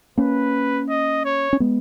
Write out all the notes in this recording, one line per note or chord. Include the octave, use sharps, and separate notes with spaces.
A#3 C#4 B4
D#5
C#5
C#4
G#3 B3